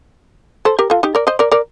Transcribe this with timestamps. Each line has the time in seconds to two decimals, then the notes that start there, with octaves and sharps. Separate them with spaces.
0.65 A4 C5
0.79 G4 A#4
0.90 F4 A4
1.03 D#4 G4
1.15 A#4 D5
1.27 C5 D#5
1.39 A#4 D5
1.52 A#4 D5